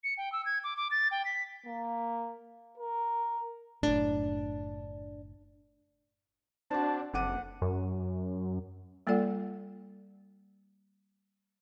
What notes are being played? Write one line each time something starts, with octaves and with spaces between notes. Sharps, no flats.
C#7
G5
E6
G#6
D6
D6
A6
G5
B6
A#3
A#4
F#1 A2 D4
C4 D4 F#4 A5
F#1 F2 F#5 D6 D#7
F#2
G3 A#3 F4 A4 D5 F#5